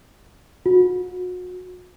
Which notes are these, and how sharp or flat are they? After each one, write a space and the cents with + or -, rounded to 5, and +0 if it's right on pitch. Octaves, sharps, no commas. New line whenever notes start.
F#4 -35